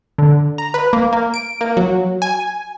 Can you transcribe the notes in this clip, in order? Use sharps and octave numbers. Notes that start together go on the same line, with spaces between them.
D3
A#5
B4
A#3
A#3
D7
A#3
F#3
G#5